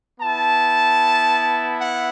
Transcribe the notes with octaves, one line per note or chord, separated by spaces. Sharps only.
B3 E4 A5
F#5